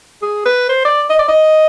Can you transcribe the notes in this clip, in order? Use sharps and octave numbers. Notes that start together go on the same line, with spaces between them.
G#4
B4
C5
D5
D#5
D5
D#5